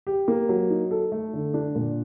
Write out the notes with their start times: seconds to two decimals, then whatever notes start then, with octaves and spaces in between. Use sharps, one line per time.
0.07 G4
0.28 A#3
0.49 F#3
0.70 D#4
0.91 A4
1.12 A3
1.33 D3
1.54 D4
1.75 A#2